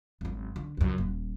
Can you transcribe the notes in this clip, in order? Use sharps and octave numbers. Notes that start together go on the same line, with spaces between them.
G#1 F#2
D3
C#2 F#2
D#1